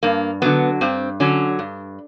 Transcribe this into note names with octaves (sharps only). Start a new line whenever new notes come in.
G2 A#3
D3 F#3 B3
G2 C4
D3 F#3 C#4
G2